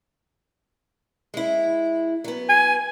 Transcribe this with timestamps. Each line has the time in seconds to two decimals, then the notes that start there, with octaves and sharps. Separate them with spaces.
1.34 G#3 E4
2.24 F#3 B3
2.49 G#5